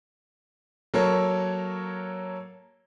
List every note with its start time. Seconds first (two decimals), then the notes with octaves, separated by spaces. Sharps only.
0.94 F#3 A#3 A4 A#4 C#5